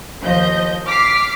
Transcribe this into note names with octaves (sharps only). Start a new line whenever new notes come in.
D#2 F3 D#5 G6
D6 F6 B6 C7